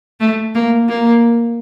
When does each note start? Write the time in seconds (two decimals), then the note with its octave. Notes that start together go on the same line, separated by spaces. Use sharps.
0.20 A3
0.55 A#3
0.89 A#3